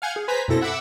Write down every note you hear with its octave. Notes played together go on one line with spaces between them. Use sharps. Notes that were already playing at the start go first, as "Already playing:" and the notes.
F5 F#5 G#5 F6 G6 G#6
G#4
B4 C5 G#5 A#5 B6
F#2 B2 C4 E4 A4 A#6
E5 F#5 B5 D6 E6